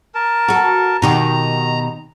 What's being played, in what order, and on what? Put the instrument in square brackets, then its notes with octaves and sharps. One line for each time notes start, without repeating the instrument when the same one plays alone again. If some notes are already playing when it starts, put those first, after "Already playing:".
[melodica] A#4 A5
[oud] F#4 A4
[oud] B2 D#3 G4 [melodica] A#5